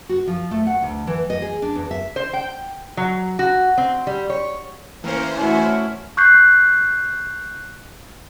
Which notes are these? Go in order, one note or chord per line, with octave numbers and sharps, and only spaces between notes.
F#4
F3
A3
F#5
D2
E3
D#5
G#4
D4
E2
E5
C5
G5
F#3
F#4
C4
G3
C#5
E3 A#3 C#4 A#4 C5
A3 C#4 E4 F#4
C#6 F#6 G6 C7